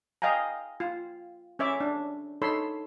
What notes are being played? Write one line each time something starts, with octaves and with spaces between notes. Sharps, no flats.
D#5 F5 G5 G#5 A#5
F4
C#4 C#5 E5 D6
D4
D#4 A4 C#5 B5 C6 E6